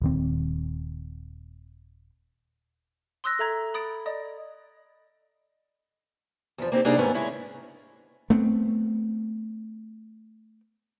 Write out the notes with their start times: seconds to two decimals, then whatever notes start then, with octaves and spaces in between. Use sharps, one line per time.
0.02 D#1 D#2 C4
3.24 C6 D#6 E6 F#6 A#6
3.39 A4 E5 A#5 G#6
3.74 B5 D#6 A6 D7
4.06 D5 D#5 D#6
6.58 E2 F3
6.72 A#3 C4 D#4 G4
6.85 C3 G3 A#3 D4 D#4 G#4
6.97 D#2 G#2 A3 B3 C#4 A#4
7.15 C#3 G#3 C#4 E4
8.30 A3 B3 C4